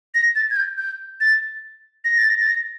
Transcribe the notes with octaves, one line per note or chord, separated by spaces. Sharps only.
A#6
A6
G#6
G6
G6
A6
A#6
A6
A#6
A6
A#6